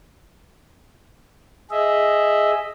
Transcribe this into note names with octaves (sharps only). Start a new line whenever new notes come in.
G#4 D#5 E5